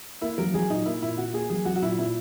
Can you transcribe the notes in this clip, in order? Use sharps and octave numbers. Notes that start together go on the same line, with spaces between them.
A#3 E4
F#3 A#4
F#3 G#4
A#2 D#4
A#3 E4
A#2 E4
A#2 F#4
A#3 G#4
F#3 G#4
F#3 F#4
F#4
A#2 E4
A#2 E4